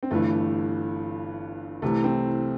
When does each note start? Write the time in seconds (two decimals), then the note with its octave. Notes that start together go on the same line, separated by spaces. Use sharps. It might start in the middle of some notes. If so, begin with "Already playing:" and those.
0.03 C4
0.11 G1 G2 E3 A3
1.82 C2 C3 E3 A3
2.04 C4